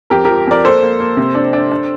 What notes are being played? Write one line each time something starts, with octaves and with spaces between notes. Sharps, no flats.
F2 G4 A#4
F3 G4 A#4
F2 A#4 D5
A#3 A4 C5
A#3
A#3
C3
D4
D4
D4